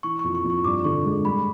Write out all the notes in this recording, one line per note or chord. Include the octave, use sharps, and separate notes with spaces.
E3 C#6
F2 C#6
C#6
F2
C#6
G2 D6
D3 C#6
G#3
G3 B5